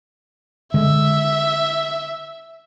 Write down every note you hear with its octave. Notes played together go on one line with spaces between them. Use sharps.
D3 G#3 E5